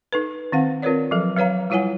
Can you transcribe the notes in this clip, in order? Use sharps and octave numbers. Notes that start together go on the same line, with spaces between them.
D#4 A4 B4
D#3 C4 F5 F#5
C4 F4 A#4 B4 C#5 D5
F3 F#3 A4
F#3 B4 C#5 F5 A#5
G3 E4 F4 C#5 F#5 G#5